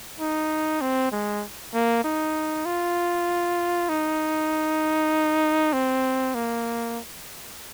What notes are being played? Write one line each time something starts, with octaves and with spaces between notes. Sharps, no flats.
D#4
C4
G#3
A#3
D#4
F4
D#4
C4
A#3